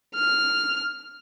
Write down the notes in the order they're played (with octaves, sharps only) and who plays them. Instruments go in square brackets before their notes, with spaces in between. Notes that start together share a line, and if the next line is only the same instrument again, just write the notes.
[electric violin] F6